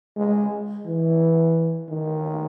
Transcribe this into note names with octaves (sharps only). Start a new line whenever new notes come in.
G#3
E3
D#3